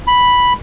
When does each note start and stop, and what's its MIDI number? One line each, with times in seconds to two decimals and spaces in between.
0.07 0.53 83